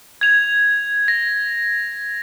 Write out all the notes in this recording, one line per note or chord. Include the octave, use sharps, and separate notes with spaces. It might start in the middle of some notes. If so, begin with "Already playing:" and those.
G#6 F7
A#6